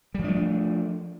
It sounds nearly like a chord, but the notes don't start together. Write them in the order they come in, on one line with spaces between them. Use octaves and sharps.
G3 F3 D4 A3